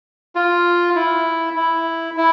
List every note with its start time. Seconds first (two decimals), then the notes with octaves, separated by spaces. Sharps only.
0.35 F4
0.95 E4
1.56 E4
2.17 E4